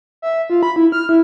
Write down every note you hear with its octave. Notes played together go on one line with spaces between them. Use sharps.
E5
F4
B5
E4
F6
E4